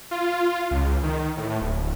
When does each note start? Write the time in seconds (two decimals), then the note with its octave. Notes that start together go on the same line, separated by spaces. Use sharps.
0.11 F4
0.71 C#2
1.03 D#3
1.37 A2
1.61 D1